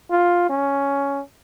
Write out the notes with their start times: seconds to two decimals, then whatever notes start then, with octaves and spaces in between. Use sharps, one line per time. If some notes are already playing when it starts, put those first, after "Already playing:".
0.11 F4
0.50 C#4